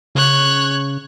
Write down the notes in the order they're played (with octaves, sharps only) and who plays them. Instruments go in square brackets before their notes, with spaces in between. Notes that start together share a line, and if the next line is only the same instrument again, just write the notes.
[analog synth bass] C#3 [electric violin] C#5 F#6